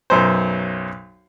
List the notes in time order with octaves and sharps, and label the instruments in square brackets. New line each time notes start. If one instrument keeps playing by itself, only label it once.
[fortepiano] B1 F#2 C5